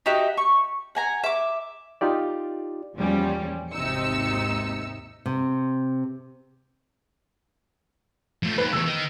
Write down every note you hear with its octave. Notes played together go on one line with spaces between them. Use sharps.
D#4 F#4 G4 E5
C#6
F#5 G#5 A#5
E5 D6
D#4 F4 G4 D5
E2 A#2 F3 G3 C#4
G#1 D#2 C3 D#4 E6 C#7
C3
F3 A3
D#2 B4
E2 C#3 E6
D#3